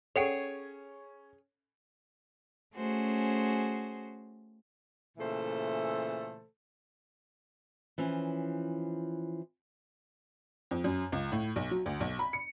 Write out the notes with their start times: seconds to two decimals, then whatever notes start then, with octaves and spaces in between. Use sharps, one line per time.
0.16 C#4 G#4 A4 C#5 F#5 G5 D7
2.75 A3 C#4 F#4 G#4 C5
5.18 A#2 C#3 E3 A3 A4 C5
7.98 E3 F3 C#4
10.71 F2
10.84 F#2
11.12 C#2
11.32 A2
11.56 B1
11.71 F#3
11.86 D2
12.00 B1
12.19 B5
12.33 C#7